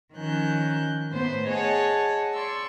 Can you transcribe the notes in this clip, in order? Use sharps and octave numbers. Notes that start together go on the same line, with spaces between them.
D#3 F3 C#4 F#6 G6
A2 B3 C5 C6
G#4 C#5 D#5 F#5 A5
D5 C6 C#6 E6